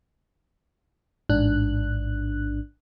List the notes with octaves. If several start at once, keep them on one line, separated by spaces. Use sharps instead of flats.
A1 G#2 D4 F#6